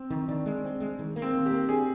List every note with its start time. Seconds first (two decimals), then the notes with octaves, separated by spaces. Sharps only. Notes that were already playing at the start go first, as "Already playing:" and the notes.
Already playing: C4
0.10 D#3
0.28 D#3 D4
0.46 G#3
0.64 C4
0.80 G#3
0.99 D#3
1.16 A#3
1.22 C4
1.34 D#3
1.46 G4
1.51 A#3
1.69 D4 G#4